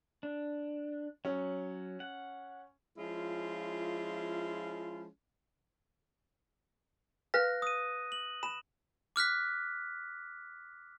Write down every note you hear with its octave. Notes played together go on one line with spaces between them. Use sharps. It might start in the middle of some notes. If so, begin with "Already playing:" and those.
D4
F#3 C#4
F#5
F3 G#3 C#4 E4 F4
B4 F5 F#6 A#6
D#6 D#7
F#7
B5 E7
D6 F6 F#6 B6